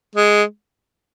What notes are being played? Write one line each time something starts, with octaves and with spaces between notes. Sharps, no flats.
G#3